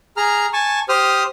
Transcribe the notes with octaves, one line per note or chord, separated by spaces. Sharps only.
G#4 A#5 F6
G#5 A5 C#6
G4 C5 D#6 F6